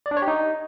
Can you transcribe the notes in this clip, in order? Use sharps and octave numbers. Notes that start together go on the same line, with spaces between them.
D5
D4
C#5
G4
D#4